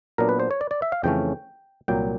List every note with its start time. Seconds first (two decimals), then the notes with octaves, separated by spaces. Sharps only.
0.18 A#2 F#3 B3 D4 A#4
0.29 B4
0.40 C5
0.51 C#5
0.61 D5
0.71 D5
0.82 E5
0.92 F5
1.03 F2 C#3 E3 A3 C#4 G5
1.88 C2 A#2 F#3 A#3 G5